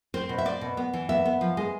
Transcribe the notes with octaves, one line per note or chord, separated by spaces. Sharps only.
C4 C5
B2
E5
C4 D5
B2
B3
E3
B3 E5
B3
F3
G#3